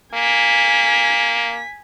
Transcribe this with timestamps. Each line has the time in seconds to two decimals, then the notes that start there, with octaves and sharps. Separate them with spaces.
0.14 A#3 G#5 B6